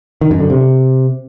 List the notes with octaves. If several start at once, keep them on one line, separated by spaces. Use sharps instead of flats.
D#3
F#2
D3
C3